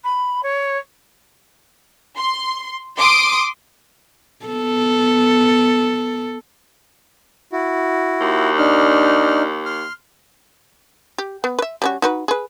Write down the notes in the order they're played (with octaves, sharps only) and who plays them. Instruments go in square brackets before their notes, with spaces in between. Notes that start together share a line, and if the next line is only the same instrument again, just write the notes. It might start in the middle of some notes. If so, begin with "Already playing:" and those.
[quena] B5
C#5
[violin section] C6
C6 D6 D#6 D7
[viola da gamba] B3 A4
[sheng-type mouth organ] E4 F#4
[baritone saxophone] D#2
[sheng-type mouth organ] D4 D#4 F6
C6 F6
[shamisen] G4
B3
B4 E5
G3 C#4 F#4
D#4 F#4 B4
G#4 B4